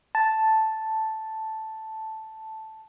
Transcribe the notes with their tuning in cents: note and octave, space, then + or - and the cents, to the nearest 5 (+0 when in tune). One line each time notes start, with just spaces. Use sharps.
A5 +0